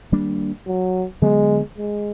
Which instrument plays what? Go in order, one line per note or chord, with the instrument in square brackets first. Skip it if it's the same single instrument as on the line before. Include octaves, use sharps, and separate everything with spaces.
[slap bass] D#3 G3 A#3 D4
[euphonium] F#3
[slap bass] D3 F#3 B3 [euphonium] G#3
[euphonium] G#3